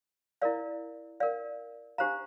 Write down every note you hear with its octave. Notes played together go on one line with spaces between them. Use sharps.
E4 A#4 D5 F5
A#4 D5 F5
D4 G4 C5 F5 A#5